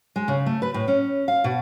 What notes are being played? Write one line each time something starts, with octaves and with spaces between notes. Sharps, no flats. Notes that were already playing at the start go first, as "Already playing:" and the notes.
G#3
C#3
A3
B4
A2
C#4
F5
B2